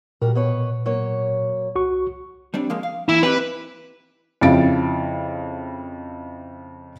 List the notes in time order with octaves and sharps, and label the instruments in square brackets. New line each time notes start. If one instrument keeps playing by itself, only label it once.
[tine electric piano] A#2 [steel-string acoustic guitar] G3 F#4 A#4
[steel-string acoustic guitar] B2 B4 C#5
F#3 A#3 C#5
[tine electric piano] C2 F#4 C#6
[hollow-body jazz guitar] G3 C4 D4
F3 G#3 A#3
F5
[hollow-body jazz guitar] E3 A#3 [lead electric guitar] E4
[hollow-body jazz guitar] C4 D#4 G4 [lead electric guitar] B4
[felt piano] F2 C#3 E4 F5 A6 D7